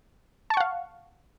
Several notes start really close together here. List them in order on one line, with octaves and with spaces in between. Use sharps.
A5 C#6 F#5 F5